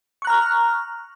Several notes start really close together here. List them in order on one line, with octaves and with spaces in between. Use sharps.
C#6 F#6 A#5 F6